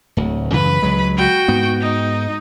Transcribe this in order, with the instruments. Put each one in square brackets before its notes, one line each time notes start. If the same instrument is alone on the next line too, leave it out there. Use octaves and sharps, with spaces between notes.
[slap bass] D1 D2
[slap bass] F#2 C#3 E3 [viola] B4 B5
[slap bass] C#2 F#3 G#3
[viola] F#4 G5
[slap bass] G#2 B3
[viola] D#4